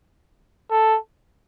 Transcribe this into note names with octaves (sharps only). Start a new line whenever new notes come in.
A4